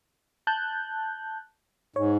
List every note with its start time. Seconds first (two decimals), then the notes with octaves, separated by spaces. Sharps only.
0.47 A5 F#6 G6
1.96 G#2 C#5